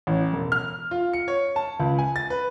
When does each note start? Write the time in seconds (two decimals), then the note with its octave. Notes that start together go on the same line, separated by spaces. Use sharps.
0.07 A1
0.33 E1
0.52 F6
0.91 F4
1.13 C#7
1.28 C#5
1.56 A5
1.80 C#2
1.99 G#5
2.16 A6
2.30 B4